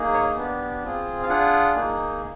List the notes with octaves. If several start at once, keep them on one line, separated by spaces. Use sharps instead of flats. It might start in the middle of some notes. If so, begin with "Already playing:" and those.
Already playing: A#3 D#4 G#4
C#5
B3 D4 G4
C4 F4 G#4
F5
D4 F4 G#4 F#5
A#3 D#4 G#4